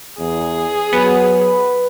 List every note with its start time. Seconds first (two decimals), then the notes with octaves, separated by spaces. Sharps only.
0.19 E2 G#4
0.93 F#3 B3 B4